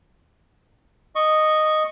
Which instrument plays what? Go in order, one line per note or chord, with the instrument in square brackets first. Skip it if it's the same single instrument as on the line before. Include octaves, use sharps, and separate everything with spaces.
[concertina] D#5 C#6